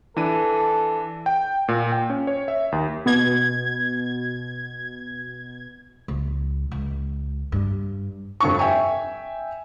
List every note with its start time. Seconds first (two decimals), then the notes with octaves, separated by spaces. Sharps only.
0.17 E3 D4 A4 D#7
1.26 G5
1.68 A#2
1.92 G5
2.10 C#4
2.27 C#5
2.48 E5
2.72 D#2
3.06 B2 G#6
6.08 C#2
6.72 C#2
7.52 G2
8.40 F1 G2 C#6
8.59 E5 G5 G#5